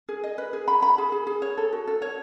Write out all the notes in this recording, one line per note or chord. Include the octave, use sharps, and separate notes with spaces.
G#4
D#5
B4
G#4
B5
B5
G#4
G#4
G#4
C#5
A4
F#4
A4
C#5